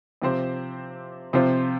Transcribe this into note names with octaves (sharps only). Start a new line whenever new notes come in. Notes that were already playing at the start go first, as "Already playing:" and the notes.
C3 F3 C4 G4 C5
C3 F3 C4 F4 C5